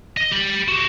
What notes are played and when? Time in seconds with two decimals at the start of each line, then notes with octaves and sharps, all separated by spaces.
0.17 D#5
0.31 G4 B5
0.68 F#4 G4